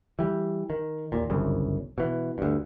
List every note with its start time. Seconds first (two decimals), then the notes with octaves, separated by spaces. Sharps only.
0.19 E3 G3
0.70 D#3
1.12 D#2 A#2
1.30 G1 C2 F#2 C#3
1.98 B2 E3
2.38 D2 G2